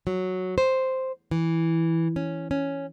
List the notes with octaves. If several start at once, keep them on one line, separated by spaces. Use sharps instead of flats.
F#3
C5
E3
C#4
C#4